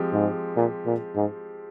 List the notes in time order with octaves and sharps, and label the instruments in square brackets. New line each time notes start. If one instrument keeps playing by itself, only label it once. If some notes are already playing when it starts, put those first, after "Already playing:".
Already playing: [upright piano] F3 G#3 C4 G4
[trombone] G#2
A#2
A#2
G#2